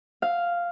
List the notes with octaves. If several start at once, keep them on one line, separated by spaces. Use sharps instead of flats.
F5